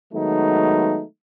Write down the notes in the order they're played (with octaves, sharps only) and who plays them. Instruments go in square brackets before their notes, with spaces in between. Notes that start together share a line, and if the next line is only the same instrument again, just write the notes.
[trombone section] D#3 F#3 G#3 A3 B3 D#4